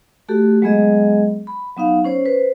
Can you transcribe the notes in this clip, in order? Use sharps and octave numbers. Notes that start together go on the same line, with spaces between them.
A3 F#4 G4 A4
F#3 G#3 B3 G#4 D#5
B5
F#3 B3 D#4 F5
C#4 C5 C#5
B4 C5